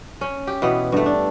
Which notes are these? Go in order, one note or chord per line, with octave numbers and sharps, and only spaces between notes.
C#4
G4
B2 E3 B3
G2 A3
D4